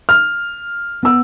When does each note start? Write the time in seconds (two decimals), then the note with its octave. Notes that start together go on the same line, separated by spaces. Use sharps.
0.09 F6
1.03 B3 E6